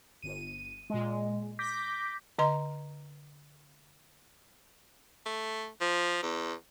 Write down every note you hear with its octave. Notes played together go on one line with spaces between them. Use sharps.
G1 D#7
A#2 G#3
D6 G6 A#6 B6
D3 D#5 A#5 C6
A3
F3
E2